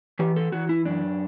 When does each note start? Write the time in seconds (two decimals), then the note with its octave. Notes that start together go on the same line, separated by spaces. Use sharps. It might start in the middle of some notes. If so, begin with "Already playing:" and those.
0.19 E3 G4
0.36 A4
0.52 E3 F#4
0.69 E4
0.85 F#2 D4